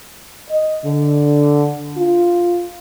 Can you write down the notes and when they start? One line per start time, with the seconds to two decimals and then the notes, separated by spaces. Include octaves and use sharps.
0.49 D#5
0.85 D3
1.97 F4